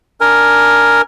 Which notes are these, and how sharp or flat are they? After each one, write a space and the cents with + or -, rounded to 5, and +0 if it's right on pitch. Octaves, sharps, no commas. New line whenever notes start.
D4 +0 A#4 +5 G#5 +0